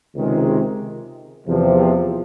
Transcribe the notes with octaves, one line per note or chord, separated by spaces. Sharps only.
C#2 C3 D#3 G#3
E2 C3 F3